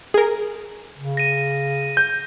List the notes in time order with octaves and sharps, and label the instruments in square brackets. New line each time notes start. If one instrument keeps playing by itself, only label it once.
[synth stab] G#4 A#4
[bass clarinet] C#3
[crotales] A#6 D#7
[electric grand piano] G6